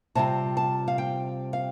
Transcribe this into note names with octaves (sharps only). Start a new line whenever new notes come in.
C3 G3 C4 F4 A5
A5
F5
G5
F5